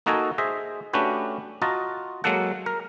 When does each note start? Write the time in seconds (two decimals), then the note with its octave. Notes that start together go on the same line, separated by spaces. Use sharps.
0.06 A#3 D#4 F#4 A4 D#5 G#5
0.38 G#4 C5 D#5 E5
0.93 A3 C#4 D4 F#4 G4 B4
1.62 F4 F#4 D#5 A5 A#5
2.24 F#3 G#3 A#3 A4 F#5
2.66 A#4